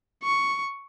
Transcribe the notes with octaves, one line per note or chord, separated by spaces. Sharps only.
C#6